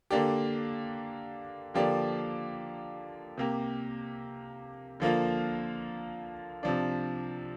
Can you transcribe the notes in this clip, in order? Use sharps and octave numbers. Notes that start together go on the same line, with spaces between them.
D3 A#3 D4 G4
D3 F3 A#3 G4 D5
C3 A#3 G4
D3 F3 A#3 F4
C3 F3 D4